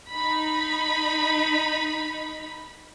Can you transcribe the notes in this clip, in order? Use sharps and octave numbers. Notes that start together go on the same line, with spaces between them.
D#4 B5